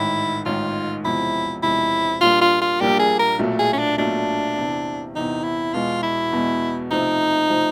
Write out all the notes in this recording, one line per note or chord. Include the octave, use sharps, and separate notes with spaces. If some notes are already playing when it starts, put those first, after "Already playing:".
Already playing: A1 G#2 D#3 E4
A1 G#2 D#3 F4
E1 E2 C3 F3 G#3 E4
E1 E2 C3 F3 G#3 E4
A#1 A#2 G3 A#3 D4 F4
F4
F4
A#1 A#2 G3 A#3 D4 G4
G#4
A#4
B1 A#2 F#3 A3
G#4
C#4
D4
B1 A#2 F#3 A3 D4
E2 C3 E3
E2 C3 E3 D#4
E4
E2 B2 G#3 F4
E4
E2 B2 G#3
C3 F3 A3 C4 D#4
C3 F3 A3 C4